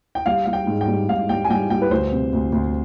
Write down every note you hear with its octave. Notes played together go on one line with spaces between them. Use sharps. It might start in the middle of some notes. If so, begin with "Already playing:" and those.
G5
G3 F5
G3 F5
G5
G#2
G5
G3
G#2 F5
G3 G5
G#5
G3 G5
G3 G5
B4
D2 C5
C3
D2
D2